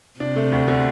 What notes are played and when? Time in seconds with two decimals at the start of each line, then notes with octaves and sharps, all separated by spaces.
0.20 C3 D4
0.36 A3
0.52 D2
0.68 D3